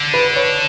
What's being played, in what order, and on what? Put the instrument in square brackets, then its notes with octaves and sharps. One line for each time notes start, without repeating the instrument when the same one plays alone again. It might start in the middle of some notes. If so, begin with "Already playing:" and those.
Already playing: [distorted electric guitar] D3
[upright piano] B4
C#5